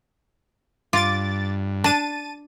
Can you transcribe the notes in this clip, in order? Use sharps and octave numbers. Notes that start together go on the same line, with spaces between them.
G2 F4 D6 A6
D4 A5 A6 D#7